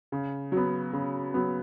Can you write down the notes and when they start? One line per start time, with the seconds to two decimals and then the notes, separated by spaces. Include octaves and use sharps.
0.12 C#3
0.52 F#3 B3
0.93 C#3
1.34 F#3 B3